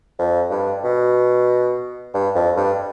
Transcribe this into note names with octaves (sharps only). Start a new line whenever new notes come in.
F2
G2
B2
G2
F2
G2